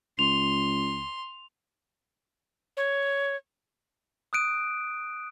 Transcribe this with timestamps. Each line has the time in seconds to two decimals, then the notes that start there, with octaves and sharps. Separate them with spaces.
0.19 C#2 C6 F7
2.77 C#5
4.33 D#6 F#6 D7 D#7